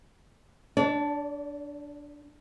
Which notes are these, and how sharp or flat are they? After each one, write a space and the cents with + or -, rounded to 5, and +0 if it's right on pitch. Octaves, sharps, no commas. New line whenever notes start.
D4 -5 D5 -45